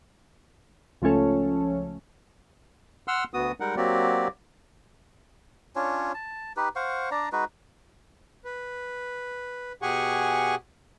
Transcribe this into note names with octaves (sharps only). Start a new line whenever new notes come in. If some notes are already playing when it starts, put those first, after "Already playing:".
C#2 F3 A3 C#4 A4
F#5 C6 E6 F6
D2 B3 F#4 D#6
G3 G#3 D#4 A#4 F#5
F#3 A#3 C4 F#4 G4 D5
C#4 D4 F4 C#5
A5
D#4 G4 B4
C5 F5 F#5 C#6
D4 D5 A#5
G#3 D#4 F#4 B4
B4
B2 G4 G#4 F#5 G#5 C#6